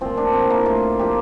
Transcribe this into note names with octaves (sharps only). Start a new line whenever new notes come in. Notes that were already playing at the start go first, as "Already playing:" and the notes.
A#2 F3 C4
D4
C4
A2 F3 A#3
F4
A#2 F3 G4